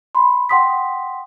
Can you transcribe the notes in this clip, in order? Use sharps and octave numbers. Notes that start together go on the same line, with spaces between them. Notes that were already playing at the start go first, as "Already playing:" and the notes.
B5 C6
F#5 G5 C6 D#6 B6